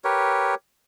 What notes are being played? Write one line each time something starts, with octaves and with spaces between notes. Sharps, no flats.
G4 A#4 B4 C#5